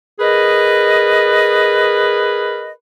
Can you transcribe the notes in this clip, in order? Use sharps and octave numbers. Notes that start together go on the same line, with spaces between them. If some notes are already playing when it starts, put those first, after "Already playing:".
G#4 A#4 B4 D#5